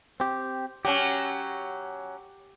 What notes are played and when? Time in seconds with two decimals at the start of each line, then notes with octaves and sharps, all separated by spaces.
0.20 C4 G4
0.85 F#3 C#4 G4